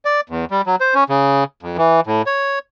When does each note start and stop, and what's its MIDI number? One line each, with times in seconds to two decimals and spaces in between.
0.05 0.21 74
0.29 0.45 40
0.51 0.61 55
0.67 0.76 54
0.81 0.94 72
0.94 1.04 61
1.09 1.44 49
1.63 1.77 41
1.77 2.00 52
2.07 2.22 45
2.26 2.59 73